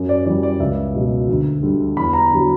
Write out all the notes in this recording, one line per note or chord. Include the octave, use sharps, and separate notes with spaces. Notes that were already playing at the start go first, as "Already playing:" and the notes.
Already playing: F#2
D5
E3 G3 D5
D5
C#2 E5
B2 F#3
D2
D3 G3
E2 B5
A#5
D3 F#3